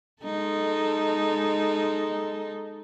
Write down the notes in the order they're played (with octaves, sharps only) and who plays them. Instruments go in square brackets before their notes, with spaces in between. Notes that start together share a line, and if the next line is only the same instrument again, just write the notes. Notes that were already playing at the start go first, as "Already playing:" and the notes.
[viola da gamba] G#3 D#4 A4